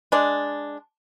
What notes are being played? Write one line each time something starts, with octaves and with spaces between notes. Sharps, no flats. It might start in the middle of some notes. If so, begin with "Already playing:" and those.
G#3 D4